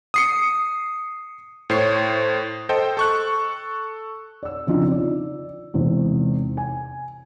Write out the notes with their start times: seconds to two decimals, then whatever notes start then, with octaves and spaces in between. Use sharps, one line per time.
0.14 D#6 C7 C#7
1.70 A2 C5 C#5 C7
2.69 A4 C5 D#5 G5
2.97 A4 C#6 F#6
4.43 D5 E6
4.67 C#3 F3 C4 D4 D#4 F4
4.91 D5
5.74 E2 G#2 C3
6.57 G#5